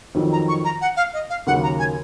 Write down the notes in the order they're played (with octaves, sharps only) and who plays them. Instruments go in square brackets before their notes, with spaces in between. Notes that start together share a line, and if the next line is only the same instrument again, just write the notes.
[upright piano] F2 D#3 F#3
[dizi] A#5
C#6
A#5
F#5
F5
D#5
F5
[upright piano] D#2 C#3 F#3 A#3 [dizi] F#5
[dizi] A#5
G#5